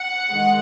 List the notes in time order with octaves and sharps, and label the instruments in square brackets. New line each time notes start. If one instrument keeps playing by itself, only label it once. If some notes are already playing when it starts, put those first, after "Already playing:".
Already playing: [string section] F#5
D#3 G#3